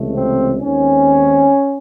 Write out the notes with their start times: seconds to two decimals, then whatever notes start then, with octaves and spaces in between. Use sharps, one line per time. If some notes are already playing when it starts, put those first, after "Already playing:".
Already playing: C#2 C3 E3 A3
0.15 C4
0.60 D#2 D#3 G#3 C4 C#4